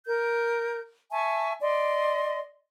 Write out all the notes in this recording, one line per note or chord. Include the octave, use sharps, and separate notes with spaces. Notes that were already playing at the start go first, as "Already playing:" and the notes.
A#4 G6
E5 G#5 A5 C#6
D5 D#5 C6